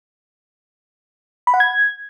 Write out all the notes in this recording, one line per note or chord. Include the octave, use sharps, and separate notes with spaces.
B5
F#5
G#6